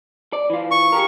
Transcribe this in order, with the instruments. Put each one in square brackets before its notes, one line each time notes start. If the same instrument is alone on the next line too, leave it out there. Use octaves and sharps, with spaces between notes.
[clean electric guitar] D5
E3 F4
[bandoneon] C#6
[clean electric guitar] G4 G#4 A#4